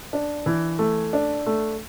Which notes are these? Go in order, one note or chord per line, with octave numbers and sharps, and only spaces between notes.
D4
E3
A3
D4
A3